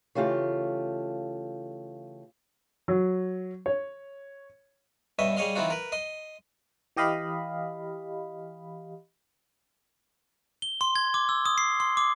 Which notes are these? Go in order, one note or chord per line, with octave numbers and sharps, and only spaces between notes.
C#3 E3 A3 F4 G4 F5
F#3
C#5
G2 B2 C#4 D#5 E5
G3 G#4 C#5 D#5 F5 C6
E3 B3 C4 D#4 F4 F#4
A#4 B4
D#5 C6
E3 G4 D#5 F5 B5
G7
C6
G#6
D6
E6
D#6
C7
C6
D6